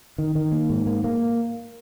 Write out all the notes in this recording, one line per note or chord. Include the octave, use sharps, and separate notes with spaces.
D#3
D#3
A#3
G#2
A#3
A#3